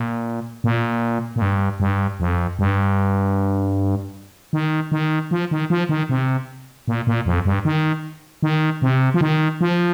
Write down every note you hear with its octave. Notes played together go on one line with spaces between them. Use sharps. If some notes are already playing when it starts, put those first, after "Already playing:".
Already playing: A#2
A#2
A#2
G2
G2
F2
G2
D#3
D#3
F3
D#3
F3
D#3
C3
A#2
A#2
F2
G2
D#3
D#3
C3
F3
D#3
F3